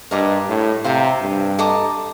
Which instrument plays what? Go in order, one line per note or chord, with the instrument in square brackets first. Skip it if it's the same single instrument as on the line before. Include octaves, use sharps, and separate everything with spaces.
[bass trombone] G2 [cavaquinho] A#4 D#5 A#5 D6
[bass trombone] A2
[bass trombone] C3 [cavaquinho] C5 F5 A#5
[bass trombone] G2
[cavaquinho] A4 D#5 A#5 D6